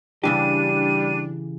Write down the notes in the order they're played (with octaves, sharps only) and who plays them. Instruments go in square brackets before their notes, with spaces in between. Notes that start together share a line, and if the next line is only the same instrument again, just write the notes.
[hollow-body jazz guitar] C#3 E3 G4 [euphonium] G3 [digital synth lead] D4 [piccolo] D#7